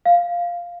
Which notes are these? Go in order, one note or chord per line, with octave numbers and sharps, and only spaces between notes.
F5